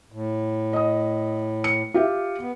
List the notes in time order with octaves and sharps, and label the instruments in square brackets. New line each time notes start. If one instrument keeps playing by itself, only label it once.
[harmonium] A2
[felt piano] D#5 D#6
C#7
F4 G4 E5
[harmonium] B3